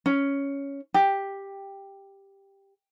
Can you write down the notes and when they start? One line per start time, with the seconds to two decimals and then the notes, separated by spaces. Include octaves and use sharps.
0.06 C#4
0.94 G4